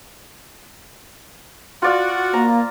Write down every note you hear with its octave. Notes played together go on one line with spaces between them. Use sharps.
F4 F#4 D5 F5
A#3 A#5